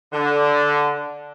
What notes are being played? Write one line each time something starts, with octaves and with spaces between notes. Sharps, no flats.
D3